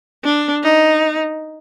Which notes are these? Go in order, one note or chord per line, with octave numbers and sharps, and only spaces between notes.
D4
D#4